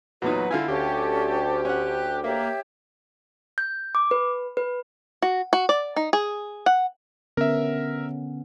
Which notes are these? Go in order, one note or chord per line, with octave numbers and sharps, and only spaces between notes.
E2 A#2 F#3 D#4 F#4 B4
D3 E4 F4 G#5
D2 C#4 G4 A4
C#4 F#5 F#6
A#3 G4 C#5 E5
G6
D6
B4
B4
F#4
F#4
D5
D#4
G#4
F#5
D3 B3 C#4 A#4 E5